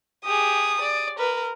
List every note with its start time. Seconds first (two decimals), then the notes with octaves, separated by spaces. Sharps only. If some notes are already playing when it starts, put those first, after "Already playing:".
0.25 G4 G#4 D#6
0.80 D5
1.18 A#4 B4